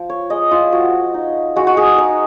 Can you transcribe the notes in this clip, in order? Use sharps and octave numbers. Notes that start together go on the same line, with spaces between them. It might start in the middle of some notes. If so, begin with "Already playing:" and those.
Already playing: F3
C#5
G#3 D#5
F4
F3 F#4
D#4
G#3 F#4
F#4
G#4
D#4 A#4